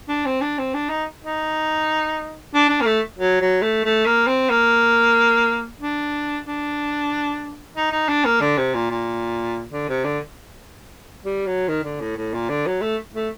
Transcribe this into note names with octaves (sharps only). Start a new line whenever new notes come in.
D4
C4
D4
C4
D4
D#4
D#4
D4
D4
A#3
A3
F#3
F#3
A3
A3
A#3
C4
A#3
D4
D4
D#4
D#4
D4
A#3
D3
C3
A#2
A#2
D3
C3
D3
G3
F#3
D#3
D3
A2
A2
A#2
D3
F#3
A3
A3